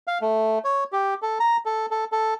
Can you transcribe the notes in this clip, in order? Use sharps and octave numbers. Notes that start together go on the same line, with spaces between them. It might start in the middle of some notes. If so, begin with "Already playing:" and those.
F5
A3
C#5
G4
A4
A#5
A4
A4
A4